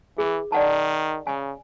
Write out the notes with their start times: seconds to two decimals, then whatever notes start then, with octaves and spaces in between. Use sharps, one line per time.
0.18 E3 G#4
0.52 D#3 D5 F#5 A5
1.27 C#3 G#5